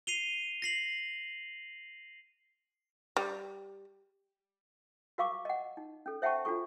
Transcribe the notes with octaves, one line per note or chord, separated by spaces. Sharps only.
C7 D#7 F7 G7
A#6 C7 F#7
G3
F#4 A#4 F5 C#6 D6
D#5 F#5
D#4
C#4 A4
C5 E5 F#5 G5 A5 C#6
D4 F4 F#4 A4 C#6